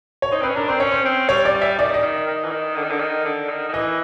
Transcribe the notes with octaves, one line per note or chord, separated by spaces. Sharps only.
C#5
D#4 C5
C4 B4
C#4
D4 A#4
C4 C5
C#4 C#5
C5
C4
G3 C#5
D5
G3
E5
D#3 D5
D#5
D#3
D#3
E3
D#3
D3
D#3
D3
D#3
D3
D#3
D#3
E3 D#5